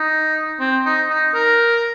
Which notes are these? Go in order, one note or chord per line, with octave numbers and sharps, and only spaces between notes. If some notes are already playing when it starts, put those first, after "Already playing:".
Already playing: D#4
C4
D#4
D#4
A#4